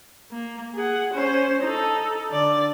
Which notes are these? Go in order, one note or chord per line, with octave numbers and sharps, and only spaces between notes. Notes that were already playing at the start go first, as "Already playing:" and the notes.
A#3
G#4 F#5
C#4 C5
D#4 A4
D3 D5